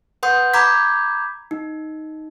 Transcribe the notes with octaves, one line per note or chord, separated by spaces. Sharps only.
B4 F#5 C6 D#6 G6
A#5 B5 D6 G6 G#6 B6
D#4